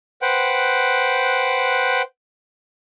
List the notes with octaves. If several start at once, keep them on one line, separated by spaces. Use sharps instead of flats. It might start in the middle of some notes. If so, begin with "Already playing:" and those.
B4 C5 F#5 G5